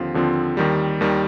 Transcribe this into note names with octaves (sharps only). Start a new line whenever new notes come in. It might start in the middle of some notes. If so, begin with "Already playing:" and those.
Already playing: D#2 D3 F3 C4 F4
D#2 D3 F3 C4 F4
D#2 D#3 G3
D#2 D#3 G3